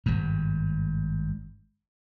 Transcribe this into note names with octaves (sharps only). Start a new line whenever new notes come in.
G#1 G2